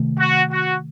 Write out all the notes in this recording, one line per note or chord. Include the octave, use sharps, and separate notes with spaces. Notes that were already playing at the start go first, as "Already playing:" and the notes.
Already playing: C3 D#3 A3
F#4
F#4